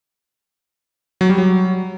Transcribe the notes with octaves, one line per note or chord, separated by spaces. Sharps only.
F#3
G3
F#3